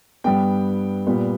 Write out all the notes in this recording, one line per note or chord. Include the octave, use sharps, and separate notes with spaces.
G2 G3 B3 G5
A#2 G3 B3